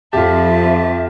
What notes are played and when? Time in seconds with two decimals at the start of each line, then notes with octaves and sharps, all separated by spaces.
0.13 F2 F4 G4 E5 A5